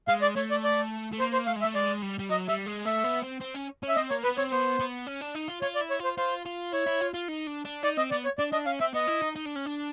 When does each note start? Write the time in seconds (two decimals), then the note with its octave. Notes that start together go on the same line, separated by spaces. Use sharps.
0.08 G#3 F5
0.22 D5
0.36 A3 C#5
0.51 D5
0.64 D5
1.12 A3
1.19 A#3 C5
1.33 C5
1.46 A3 F5
1.56 G#3
1.61 E5
1.64 A3
1.75 G#3 D5
2.02 G3
2.19 G3
2.29 F#3 D#5
2.48 G3 E5
2.67 G#3
2.86 A3 E5
3.04 B3
3.23 C4
3.41 C4
3.55 C#4
3.83 C#4
3.88 E5
3.96 C4 D#5
4.10 A#3 C#5
4.24 B3 B4
4.37 C4 C#5
4.51 B3 C5
4.80 B3
5.07 C#4
5.21 D4
5.35 D#4
5.48 F4
5.62 F4 C#5
5.75 D5
5.81 E4
5.90 C#5
6.00 F4 C5
6.18 F4 C5
6.46 F4
6.73 E4 C#5
6.87 E4
7.01 F4
7.14 F4
7.29 D#4
7.47 D4
7.65 D4
7.83 D#4 D5
7.97 C4 D#5
8.11 B3 D5
8.25 C#5
8.38 D4 D5
8.52 D4 D#5
8.66 C#4 F5
8.80 C4 E5
8.94 B3 D#5
9.08 E4
9.22 D#4
9.36 D#4
9.46 D4
9.56 C#4
9.66 D4